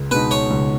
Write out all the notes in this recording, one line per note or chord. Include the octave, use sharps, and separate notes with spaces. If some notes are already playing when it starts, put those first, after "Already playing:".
Already playing: C#2
B2 G#3 D#4 B4
C#5
C#2